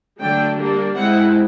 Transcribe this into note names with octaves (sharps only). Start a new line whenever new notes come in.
D3 F#3 A3 D4 G5
G3 A#3 D4
G#3 C4 E4 F#5